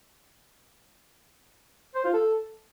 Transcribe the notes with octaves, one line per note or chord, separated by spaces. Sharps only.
C5
F4
A4